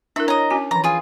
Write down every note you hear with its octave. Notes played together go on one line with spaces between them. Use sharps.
D4 E4 A#4 E5
C#5 D#5 A#5
C#4 F#4 G#5
E3 F3 A#5
F4 G#4